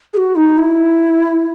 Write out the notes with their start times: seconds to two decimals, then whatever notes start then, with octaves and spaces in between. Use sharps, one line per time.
0.13 G#4
0.17 F#4
0.35 D#4
0.57 E4